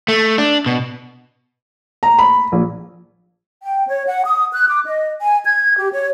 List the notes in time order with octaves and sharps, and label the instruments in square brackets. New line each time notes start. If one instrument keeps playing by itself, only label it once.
[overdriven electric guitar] A3
D4
B2
[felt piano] A#5
B5
A#1
[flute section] G5
C#5
F#5
D#6
F#6
D6
D#5
G#5
G#6
G4
C#5